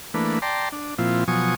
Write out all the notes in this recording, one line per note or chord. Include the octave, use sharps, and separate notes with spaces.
E3 A3 A#3 D4 B4
D5 G5 A5 A#5 C6
D4
A#2 F3 C4 E4 F4
B2 F3 F#3 G#5 C#6 D#6